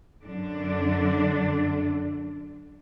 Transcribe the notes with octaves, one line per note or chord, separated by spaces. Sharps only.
F#2 D3 D4